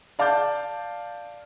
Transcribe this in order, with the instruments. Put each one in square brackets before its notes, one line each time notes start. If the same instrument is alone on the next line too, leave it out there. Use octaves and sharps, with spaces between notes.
[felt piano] D5 F5 A5 D6 G6